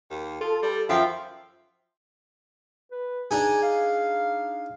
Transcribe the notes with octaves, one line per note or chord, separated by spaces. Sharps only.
D#2
F4 A4
G3
F#2 F3 E5 F5 G5
B4
D4 D#4 G#4 G#5
F5